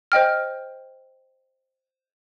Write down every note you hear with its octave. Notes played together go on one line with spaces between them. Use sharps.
C5 D#5 G5 F6